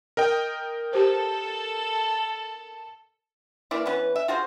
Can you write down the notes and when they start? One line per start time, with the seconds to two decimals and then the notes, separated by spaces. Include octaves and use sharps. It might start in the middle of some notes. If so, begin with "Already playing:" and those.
0.17 A#4 D#5 G5
0.93 G4 A4 C5
3.71 E3 A#3 E4 D5
3.86 E3 B3 C#4 B4
4.16 E5
4.28 F4 F#4 G#4 C5